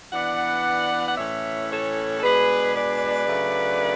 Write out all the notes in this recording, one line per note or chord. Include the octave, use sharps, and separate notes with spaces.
E3 B3 D4 D5 F#5
F#5
A2 E3 A3 C#4 C#5 E5
A4 C#5
A4
B2 G#3 D4 G#4 B4
B4 D5
C#3 F#3 A3 D4